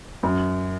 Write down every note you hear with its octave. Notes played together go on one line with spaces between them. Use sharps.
F#2